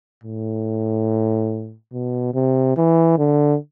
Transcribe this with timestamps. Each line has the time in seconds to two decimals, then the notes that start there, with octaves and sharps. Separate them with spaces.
0.24 A2
1.93 B2
2.34 C3
2.77 E3
3.18 D3